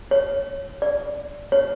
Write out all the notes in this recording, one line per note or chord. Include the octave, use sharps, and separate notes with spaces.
C#5
D5
C#5